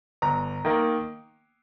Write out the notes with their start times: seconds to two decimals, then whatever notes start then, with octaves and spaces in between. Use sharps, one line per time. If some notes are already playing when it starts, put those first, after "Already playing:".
0.22 G1 A#5
0.65 D#3 A#3